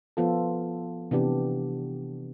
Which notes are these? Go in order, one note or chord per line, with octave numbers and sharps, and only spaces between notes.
F3 B3 F4 A4
C3 E3 B3 D4 G4